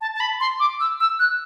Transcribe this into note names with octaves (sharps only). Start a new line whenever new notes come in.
A5
A5
B5
C6
D6
E6
E6
F#6